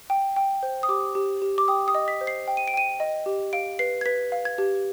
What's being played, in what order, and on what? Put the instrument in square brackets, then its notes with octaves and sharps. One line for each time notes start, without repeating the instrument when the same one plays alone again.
[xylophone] G5
G5
C5
D#6
G4 D6
G4
G4
D6
G5 D#6
D#6
D#5
B6
C5
C7
G5
D#7
D7
G5 D#7
D#5
G4
F5 D7
B4 C7
G#6
B4 B6
F5
G#6
G4